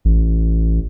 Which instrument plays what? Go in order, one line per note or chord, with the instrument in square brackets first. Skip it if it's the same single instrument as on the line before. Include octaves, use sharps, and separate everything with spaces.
[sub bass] A1